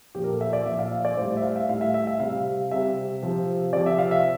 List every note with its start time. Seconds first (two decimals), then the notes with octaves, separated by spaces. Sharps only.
0.15 A#2 F3 G4
0.24 A#4
0.28 A4
0.41 E5
0.53 D5
0.66 A#2 F3 E5
0.79 F5
0.92 E5
1.05 D5
1.17 A2 G3 C5
1.37 E5
1.43 F5
1.56 E5
1.69 A2 G3 F5
1.81 E5
1.94 E5
2.07 E5
2.20 C3 G3 F5
2.71 C3 G3 E5
3.22 C3 F3
3.73 C3 F3 D5
3.86 E5
3.99 F5
4.11 E5